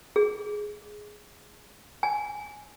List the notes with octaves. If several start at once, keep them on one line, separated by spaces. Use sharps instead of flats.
G#4
G#5